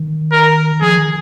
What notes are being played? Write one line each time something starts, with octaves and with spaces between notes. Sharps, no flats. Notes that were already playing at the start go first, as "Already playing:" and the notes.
Already playing: D#3
A#4
F3 G#4
D#3